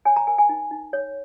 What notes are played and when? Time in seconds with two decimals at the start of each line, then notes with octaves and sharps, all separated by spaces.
0.05 C#5 G#5
0.16 A#5
0.27 A#4 G#5
0.38 G#5
0.49 D#4
0.71 D#4
0.93 C#5